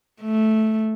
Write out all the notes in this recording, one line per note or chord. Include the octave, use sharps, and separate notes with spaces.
A3